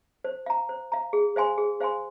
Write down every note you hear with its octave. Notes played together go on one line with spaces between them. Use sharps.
C5
F5 A#5
C5
F5 A#5
G#4
C5 F5 G#5 C6
G#4
C5 F5 G#5 C6